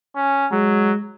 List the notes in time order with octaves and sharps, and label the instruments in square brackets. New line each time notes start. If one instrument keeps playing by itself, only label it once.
[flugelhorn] C#4
[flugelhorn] F#3 [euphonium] G#3